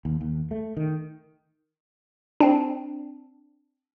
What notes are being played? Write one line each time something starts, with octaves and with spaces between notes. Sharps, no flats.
D#2
D#2
A3
D#3
C4 D4